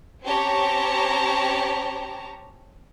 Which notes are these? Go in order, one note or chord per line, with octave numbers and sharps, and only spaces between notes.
C4 C#4 G4 C#5 A5 A#5